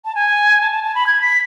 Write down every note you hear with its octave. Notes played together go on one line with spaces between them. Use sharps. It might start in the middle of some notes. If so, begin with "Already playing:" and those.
A5
G#5
A5
A5
A5
B5
G#6
B6